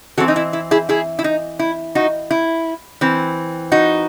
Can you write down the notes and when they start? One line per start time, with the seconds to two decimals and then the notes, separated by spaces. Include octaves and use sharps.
0.18 E3 C4 F#4 A4
0.28 D#4
0.36 E4
0.53 E4
0.71 E4 G#4
0.89 E4 G#4
1.19 E4
1.24 D#4
1.59 E4
1.95 D#4 F#4
2.31 E4
3.01 E3 C4
3.72 D#4 F#4